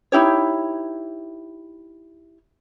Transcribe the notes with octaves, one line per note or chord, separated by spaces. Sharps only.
D#4 E4 G4 C#5